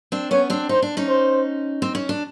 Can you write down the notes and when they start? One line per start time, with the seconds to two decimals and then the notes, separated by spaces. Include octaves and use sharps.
0.12 C4 D4
0.31 B3 C#4 C#5
0.50 C4 D4
0.69 D#4 C5
0.82 D4
0.97 C#4 D#4
1.08 C5
1.82 C4
1.95 C#4
2.09 D4